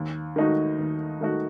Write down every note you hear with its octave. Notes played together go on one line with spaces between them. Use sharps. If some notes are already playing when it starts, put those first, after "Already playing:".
Already playing: D#2
D#3 A3 D#4 F#4
D#2
D#3 A3 D#4 F#4